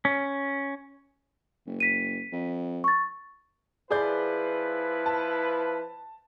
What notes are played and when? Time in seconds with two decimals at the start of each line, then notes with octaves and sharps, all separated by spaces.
0.05 C#4
1.67 F#1
1.80 B6 D#7
2.32 F2
2.84 C#6 A6
3.91 F3 E4 G#4 B4 D5 G6
5.06 A5